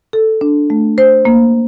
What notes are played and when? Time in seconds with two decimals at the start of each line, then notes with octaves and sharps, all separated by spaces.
0.13 A4
0.41 D4
0.70 A3
0.98 C5
1.25 A#3